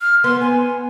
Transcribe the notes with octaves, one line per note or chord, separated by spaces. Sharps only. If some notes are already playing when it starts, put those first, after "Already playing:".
F6
B3 C6
G#5